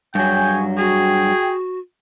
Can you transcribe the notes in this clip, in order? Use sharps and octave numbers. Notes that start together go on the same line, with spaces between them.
G2 F#3 G#4 C#5 G5 G#5
F#4 G#4 G5